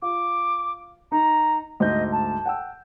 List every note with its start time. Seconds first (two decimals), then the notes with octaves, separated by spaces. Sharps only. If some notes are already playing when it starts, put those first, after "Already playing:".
0.02 F4 D6
1.12 D#4 A#5
1.80 D2 G#2 D#5 G6
2.12 A5
2.45 F#5 G5 E6